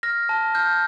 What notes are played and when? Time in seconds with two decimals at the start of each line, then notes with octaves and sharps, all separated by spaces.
0.03 F6 A#6
0.29 A5
0.55 F6 G6